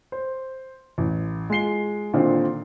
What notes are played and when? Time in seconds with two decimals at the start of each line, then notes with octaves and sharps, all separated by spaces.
0.12 C5
0.98 A1
1.50 G#3 F4 C7 G7
2.13 A#2 D3 D#3 C4 D#4